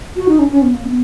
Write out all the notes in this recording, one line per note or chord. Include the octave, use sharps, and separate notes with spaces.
F#4
D#4
C#4
C#4
B3
A#3
C#4
B3